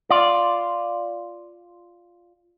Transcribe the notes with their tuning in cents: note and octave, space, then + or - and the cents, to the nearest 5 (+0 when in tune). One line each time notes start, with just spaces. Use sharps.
F4 +0 D5 +0